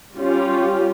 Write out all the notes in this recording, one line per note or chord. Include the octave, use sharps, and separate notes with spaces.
G3 C#4 F4 G4